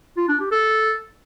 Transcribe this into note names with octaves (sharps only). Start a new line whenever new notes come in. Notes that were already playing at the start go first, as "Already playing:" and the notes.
F4
D4
G4
A4